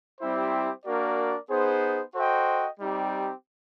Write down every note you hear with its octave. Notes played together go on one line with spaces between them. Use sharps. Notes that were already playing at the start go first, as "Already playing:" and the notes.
G3 C4 E4 G4 C5
A#3 D4 F#4 A#4 D5
B3 D#4 G#4 C5
F#4 A4 C5 D#5 G5
G3 C4 D#4 G4